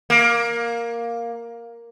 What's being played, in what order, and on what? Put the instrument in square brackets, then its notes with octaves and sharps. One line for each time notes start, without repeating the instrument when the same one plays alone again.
[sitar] A#3